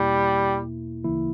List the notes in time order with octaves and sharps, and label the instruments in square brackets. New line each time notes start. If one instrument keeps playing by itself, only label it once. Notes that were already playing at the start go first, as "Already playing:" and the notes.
Already playing: [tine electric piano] E2 B2 A#3 E4 [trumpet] G3
[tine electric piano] D2 C#3 E3 A#3 E4